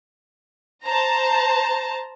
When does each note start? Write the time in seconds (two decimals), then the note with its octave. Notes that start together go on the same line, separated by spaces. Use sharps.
0.84 C5 A5 A#5